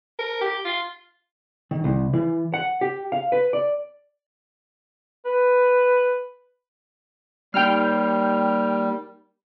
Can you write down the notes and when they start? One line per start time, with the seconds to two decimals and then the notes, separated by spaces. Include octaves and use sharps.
0.19 A#4
0.41 G4
0.65 F4
1.71 D#3
1.84 C2
2.13 E3
2.54 F#5
2.81 G4
3.12 F5
3.32 B4
3.53 D5
5.25 B4
7.54 G3 A#3 D#4 A#4 G5 F6